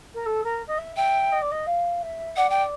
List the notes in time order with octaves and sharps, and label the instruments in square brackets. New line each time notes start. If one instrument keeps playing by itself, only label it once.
[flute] A#4
A4
A#4
D#5
E5
[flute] E5 [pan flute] G5
[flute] D#5
D5
D#5
F5
E5
[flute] D5 [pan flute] F#5
[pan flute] G5